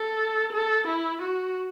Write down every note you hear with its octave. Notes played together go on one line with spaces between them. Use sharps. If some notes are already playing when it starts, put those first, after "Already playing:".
Already playing: A4
A4
E4
F#4